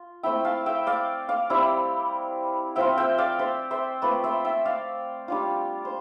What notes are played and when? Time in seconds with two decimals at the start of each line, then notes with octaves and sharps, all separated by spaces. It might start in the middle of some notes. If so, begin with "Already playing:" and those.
Already playing: F4
0.23 A3 C4 E4 E5 G5
0.45 F5 A5
0.66 E5 G5
0.87 D5 F5
1.29 D5 F5
1.50 G3 C4 E4
2.76 F3 C4 F4 E5 G5
2.98 E5 G5
3.18 D5 F5
3.39 C5 E5
3.71 C5 E5
4.02 A3 C4 F4 B4 D5
4.24 C5 E5
4.45 E5 G5
4.65 D5 F5
5.28 G3 D4 F4
5.85 C5